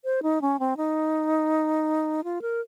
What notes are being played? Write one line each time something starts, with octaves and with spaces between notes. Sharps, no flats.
C5
D#4
C#4
C4
D#4
F4
A#4